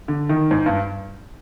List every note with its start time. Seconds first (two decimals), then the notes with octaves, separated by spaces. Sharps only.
0.08 D3
0.29 D#3
0.51 G#2
0.66 G2